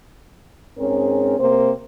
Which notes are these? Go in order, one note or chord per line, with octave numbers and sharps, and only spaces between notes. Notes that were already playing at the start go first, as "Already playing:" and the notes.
G#2 C4 C#4 G#4 A#4 C#5
C3 A#3 C4 A#4 C5